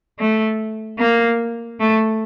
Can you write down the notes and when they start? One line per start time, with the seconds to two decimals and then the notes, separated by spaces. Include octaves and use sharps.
0.19 A3
0.99 A#3
1.80 A3